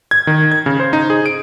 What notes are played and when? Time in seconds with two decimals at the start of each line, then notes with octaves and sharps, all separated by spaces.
0.11 G#6
0.27 D#3
0.51 G#6
0.66 C#3
0.80 C5
0.93 D#4
1.10 G#4
1.26 D7